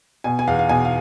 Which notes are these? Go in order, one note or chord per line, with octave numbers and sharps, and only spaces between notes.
B2 G#5
G#5
E2 F5
F5
B2 G#5
F5